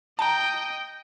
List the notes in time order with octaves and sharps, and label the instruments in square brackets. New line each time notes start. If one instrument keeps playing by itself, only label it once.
[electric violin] D#5 G5 [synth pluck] A5 A#5